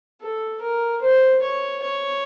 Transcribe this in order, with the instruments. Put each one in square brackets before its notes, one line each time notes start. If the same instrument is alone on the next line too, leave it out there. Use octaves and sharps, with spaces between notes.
[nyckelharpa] A4
A#4
C5
C#5
C#5